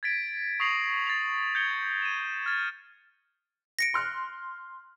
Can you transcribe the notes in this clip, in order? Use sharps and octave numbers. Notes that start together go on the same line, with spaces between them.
G#6 A6 B6 D7
C#6 D#6 A#6 C7 F7 F#7
A6 C7 F7
G6 G#6 C#7 G7
D#7 E7
F6 G#6 A6
A#6 C#7 D7
C6 F6 F#6